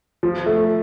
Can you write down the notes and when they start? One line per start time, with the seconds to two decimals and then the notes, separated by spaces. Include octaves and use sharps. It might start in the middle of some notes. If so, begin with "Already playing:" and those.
0.23 F3
0.46 A3